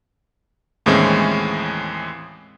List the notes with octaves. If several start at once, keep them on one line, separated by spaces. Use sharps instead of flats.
D#2 A2 E3 G#3 C4 C#4